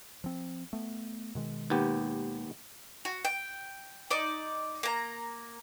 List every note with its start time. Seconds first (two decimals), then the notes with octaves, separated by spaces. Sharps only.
0.24 F3 C4
0.73 A3 B3
1.35 B2 D#3 G#3
1.70 D#2 B3 G4
3.05 F#4
3.25 G5
4.10 D#4 D5 D6
4.83 A#3 A#5